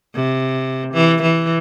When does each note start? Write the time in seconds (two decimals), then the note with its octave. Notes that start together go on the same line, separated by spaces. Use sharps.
0.15 C3
0.94 E3
1.22 E3